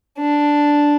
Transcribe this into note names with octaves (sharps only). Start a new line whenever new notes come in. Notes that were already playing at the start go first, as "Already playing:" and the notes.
D4